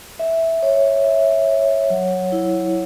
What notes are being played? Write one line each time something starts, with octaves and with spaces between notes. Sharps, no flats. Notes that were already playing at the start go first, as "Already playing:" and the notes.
E5
C#5
E5
C#5
F#3
E4